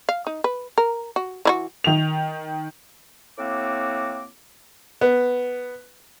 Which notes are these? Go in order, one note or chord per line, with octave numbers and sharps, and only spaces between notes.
F5
D#4
B4
A#4
F#4
E3 E4 F#4
D#3 F7
A2 A#3 C4 F#4 D6
B3